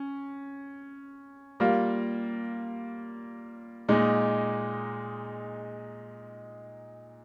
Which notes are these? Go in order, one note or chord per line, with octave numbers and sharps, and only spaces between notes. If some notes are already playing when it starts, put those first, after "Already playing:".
Already playing: C#4
G3 A#3 F4
A#2 G#3 D#4